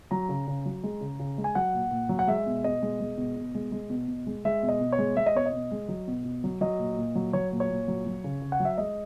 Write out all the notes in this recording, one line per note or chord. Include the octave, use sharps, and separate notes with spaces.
F#3 A#5
C#3
C#3
F#3
G#3
C#3
C#3
G#3
G#5
F#3 F#5
A#2
A#2
F#3
F#5
G#3 E5
B2
B2 D#5
G#3
G#3
B2
B2
G#3
G#3
B2
B2
G#3
G#3 E5
B2
D#5
B2
C#5
G#3
G#3 E5
D#5
B2 C#5
D#5
B2
G#3
F#3
B2
B2
F#3
F#3 D#5
A#2
A#2
F#3
F#3 C#5
A#2
C#5
A#2
F#3
F#3
C#3
C#3
F#5
F#3
E5
G#3 D#5